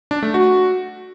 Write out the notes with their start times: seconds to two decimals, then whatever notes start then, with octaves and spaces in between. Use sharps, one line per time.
0.11 D4
0.23 A3
0.34 F#4